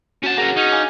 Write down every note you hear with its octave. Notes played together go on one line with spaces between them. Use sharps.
C#4 F#4 F#5 A5
A#3 C#4 F#4 G#4 F#5 A#5
C#4 D#4 C#7
F5 G#5 D6